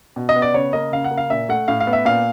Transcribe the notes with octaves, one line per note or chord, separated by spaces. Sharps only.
B2
D#5
B3
D5
C#3 C#5
A#3 D#5
C#3 F5
F#5
A#3
F5
A#2 E5
A3 F#5
A2 F5
F5
B3
E5
A#2 F5